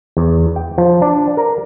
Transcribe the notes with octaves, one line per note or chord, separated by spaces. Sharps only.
E2
G5
F3
D4
A#4